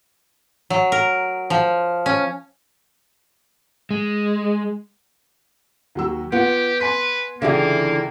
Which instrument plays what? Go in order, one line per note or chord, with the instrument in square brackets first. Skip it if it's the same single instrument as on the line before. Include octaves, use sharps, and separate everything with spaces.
[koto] F#3
A#4
F3
C#4
[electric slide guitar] G#3
[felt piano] D#2 F#3 E6
[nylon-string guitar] B3 [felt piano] F4 F#5 [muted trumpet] G4
[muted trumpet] B4 [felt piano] G#5 C6 B6
[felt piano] C#2 G4 E5 [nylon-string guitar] D3 E3 G#4 [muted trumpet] A#3